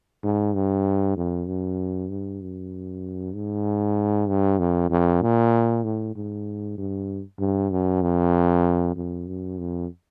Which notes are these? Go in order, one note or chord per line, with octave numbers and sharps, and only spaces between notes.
G#2
G2
F2
F#2
G2
F#2
G#2
G2
F2
F2
A#2
A2
G#2
G2
G2
F#2
F2
F2
F#2
F2